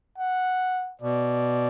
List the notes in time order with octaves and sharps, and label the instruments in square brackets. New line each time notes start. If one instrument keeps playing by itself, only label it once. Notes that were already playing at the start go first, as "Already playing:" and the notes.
[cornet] F#5
[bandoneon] B2 [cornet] D5